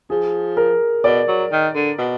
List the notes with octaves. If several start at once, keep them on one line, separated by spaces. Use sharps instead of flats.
F3 G#4
A#4
B2 D5
F#3
D#3
D3
B2